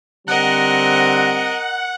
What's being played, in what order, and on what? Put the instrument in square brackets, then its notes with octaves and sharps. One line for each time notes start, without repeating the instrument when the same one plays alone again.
[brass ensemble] D3 G3 C4 [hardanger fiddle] A#4 D#5 [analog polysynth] F#5